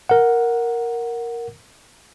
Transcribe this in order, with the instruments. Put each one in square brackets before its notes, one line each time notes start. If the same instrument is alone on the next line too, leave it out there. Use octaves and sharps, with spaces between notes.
[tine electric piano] A#4 F#5